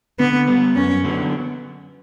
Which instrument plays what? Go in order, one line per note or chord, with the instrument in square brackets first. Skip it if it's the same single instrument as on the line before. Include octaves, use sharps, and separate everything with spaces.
[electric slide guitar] D3 [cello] B3
[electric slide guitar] G3 B3
[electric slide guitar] F#2 [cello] C#4
[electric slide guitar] D3 F#3 B3